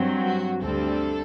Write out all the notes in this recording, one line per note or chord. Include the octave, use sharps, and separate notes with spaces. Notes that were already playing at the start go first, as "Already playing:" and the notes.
Already playing: G2 F#3 C4
F#4
D2 D3 G3 C4 A4